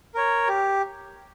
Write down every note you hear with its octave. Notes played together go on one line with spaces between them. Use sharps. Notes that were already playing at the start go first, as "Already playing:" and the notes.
A#4 C#5
G4